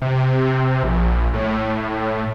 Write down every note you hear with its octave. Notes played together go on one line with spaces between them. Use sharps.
C3
A#1
A2